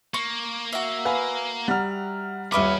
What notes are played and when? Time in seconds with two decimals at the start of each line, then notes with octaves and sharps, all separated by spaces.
0.14 A#3 C#6
0.73 F#4 E5
1.05 B4 F5 G#5
1.68 G3 F#5 A#5 F6
2.52 D#1 C#4 G#4 B4 D#5 E5 B5 D6